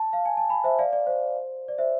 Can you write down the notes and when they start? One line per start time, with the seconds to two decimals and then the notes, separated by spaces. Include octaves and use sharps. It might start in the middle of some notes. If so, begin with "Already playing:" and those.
Already playing: A5
0.13 F5
0.26 G#5
0.37 A5
0.49 G#5 B5
0.64 C5 E5
0.79 D5 F5
0.93 D5
1.07 C5
1.68 D5
1.78 C5 E5